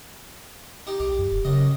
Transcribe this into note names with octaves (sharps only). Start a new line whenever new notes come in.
D#4 G4
B1 G4
F#2
E1
F#2 C#3 D#5